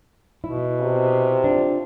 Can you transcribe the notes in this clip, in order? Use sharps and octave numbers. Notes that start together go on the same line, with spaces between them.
B2 E4
C3
D4 F4